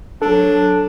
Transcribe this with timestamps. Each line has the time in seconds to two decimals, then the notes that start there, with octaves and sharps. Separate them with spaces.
0.22 F#3 D4 A4